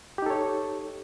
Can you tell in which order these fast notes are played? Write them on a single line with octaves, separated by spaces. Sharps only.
G4 D#4 A4 C#5